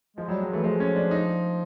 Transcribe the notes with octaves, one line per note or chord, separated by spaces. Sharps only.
F3 G#3
F#3 G3
G#3
E3 A3
F3 G#3
C#4
D4
D#4